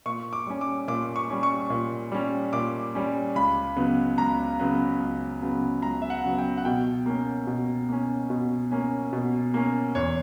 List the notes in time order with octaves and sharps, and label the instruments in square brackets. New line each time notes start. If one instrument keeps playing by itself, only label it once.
[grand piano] A#2 C#6
D6
G3 C#4
D6
A#2 D6
C#6
G3 C#4
C#6
A#2
G3 C#4
A#2 D6
G3 C#4
C#2 B5
C#3 F#3 B3
C#2 A#5
C#3 F#3 B3
C#2
C#3 F#3 B3
C#2 A#5
E5
F#5
C#3 F#3 B3
G5
F#5
B2 G5
A#3 C#4
B2
A#3 C#4
B2
A#3 C#4
B2
A#3 C#4
E2 C#5